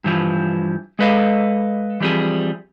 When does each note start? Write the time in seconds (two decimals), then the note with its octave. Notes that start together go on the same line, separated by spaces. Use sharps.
0.04 G2 E3 F3
0.99 G#3 A4 B4 D#5 F5
2.00 E3 F3 G3 C4 G#4